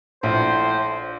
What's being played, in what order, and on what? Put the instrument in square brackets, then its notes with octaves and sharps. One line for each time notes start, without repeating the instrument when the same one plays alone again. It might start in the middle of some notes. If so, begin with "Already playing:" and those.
[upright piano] A#1 [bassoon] A2 [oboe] C5